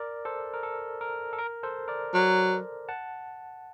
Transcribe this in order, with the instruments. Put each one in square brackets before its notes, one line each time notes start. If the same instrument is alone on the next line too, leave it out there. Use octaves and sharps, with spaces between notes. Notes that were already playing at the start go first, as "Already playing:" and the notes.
Already playing: [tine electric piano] A#4 D5
A4 C5
A#4
A4
A#4
A4
A#4
A4 C5
A#4 D5
[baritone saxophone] F#3
[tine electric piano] F#5 A5